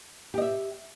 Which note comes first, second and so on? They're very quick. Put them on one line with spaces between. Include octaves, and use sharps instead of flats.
G4 D#5 E5